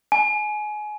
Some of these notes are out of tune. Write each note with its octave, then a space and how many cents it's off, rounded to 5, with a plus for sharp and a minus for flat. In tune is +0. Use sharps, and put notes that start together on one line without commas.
G#5 +25